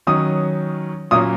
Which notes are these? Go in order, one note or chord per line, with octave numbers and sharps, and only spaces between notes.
D#3 F#3 C#4 D#6
A#2 F#3 A#3 C#4 D#6